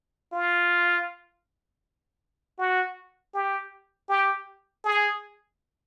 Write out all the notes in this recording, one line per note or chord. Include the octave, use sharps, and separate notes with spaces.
F4
F#4
G4
G4
G#4